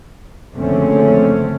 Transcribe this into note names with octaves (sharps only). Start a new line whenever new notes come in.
F#1 F2 D3 A3 C4 C#4